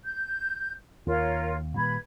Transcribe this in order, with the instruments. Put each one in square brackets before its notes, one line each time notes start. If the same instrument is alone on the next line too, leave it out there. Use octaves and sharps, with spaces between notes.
[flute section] G6
[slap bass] D#2 [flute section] F4 A#4 C#5
[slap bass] A#2 D#3 G3 [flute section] B4 B5 G#6